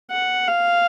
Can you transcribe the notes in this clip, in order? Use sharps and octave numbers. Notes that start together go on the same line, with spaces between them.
F#5
F5